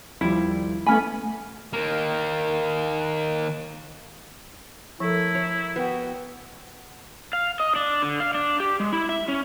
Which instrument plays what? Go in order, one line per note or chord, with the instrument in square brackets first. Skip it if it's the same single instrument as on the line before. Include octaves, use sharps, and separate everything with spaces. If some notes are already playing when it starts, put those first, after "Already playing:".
[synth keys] D#2 F3 G3 [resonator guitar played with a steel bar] E4
[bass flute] A3 [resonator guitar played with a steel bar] B3 C#4 G#5 [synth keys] B5
[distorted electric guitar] D#3 A#3
[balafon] F3 A4 [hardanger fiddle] A3 A#4 [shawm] E4
[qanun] C#5
[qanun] B3 [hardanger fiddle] F#4 G5
[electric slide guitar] F5
D#5
D4
D3
F5
D4
G4
G#3
E4
E5
C#4